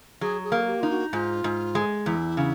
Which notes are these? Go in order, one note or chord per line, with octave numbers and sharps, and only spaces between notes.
F#3 G#4
G#4
A#3
G4
D#4 F4
F#4
G#2 F4
G#2
G#3
E2 E4
C#3